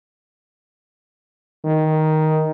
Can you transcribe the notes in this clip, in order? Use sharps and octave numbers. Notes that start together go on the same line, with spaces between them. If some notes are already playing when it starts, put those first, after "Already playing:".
D#3